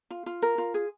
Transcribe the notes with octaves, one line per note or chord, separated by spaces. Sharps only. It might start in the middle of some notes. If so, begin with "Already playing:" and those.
F4
F4
A#4
F4
G#4